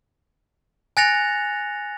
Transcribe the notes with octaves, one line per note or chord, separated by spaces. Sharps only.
G#5 F#6 A6 A#6 C#7 F7